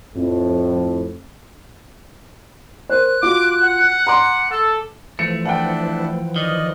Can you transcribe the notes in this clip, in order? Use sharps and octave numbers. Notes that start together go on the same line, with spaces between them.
F2 A2
A#4 C5 F#6
F4 F#4 D6
F#5
A#5 C6 D6
A4
E3 F3 A3 C#7
D4 E4 F#5 G5
D#3 D5 D#5